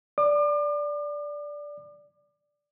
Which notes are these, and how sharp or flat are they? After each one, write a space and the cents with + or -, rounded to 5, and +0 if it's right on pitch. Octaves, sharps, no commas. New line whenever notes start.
D5 -5 D6 +35